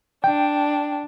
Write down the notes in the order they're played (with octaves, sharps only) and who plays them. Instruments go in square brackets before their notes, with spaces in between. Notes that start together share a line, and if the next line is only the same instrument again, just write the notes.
[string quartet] D4 [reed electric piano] G5